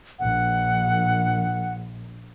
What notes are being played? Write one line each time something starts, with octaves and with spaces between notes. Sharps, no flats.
A#1 F#5